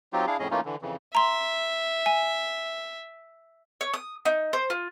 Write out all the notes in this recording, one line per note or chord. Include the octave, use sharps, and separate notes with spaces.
F#3 C4 D#4 F4 G4
D4 E4 G#4 F5
F2 A2 C#4 G#4 D#5
E3 A3 A#3 C#4 D#4 F4
D3 E3
F2 C#3 E3
E5 A#5 C6
G#5
C#5
D#6
D#4
C5
F4